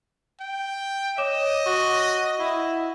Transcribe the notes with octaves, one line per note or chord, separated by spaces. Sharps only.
G5
C#5 D#5 D6 E7
F#4 C#6
E4 F#5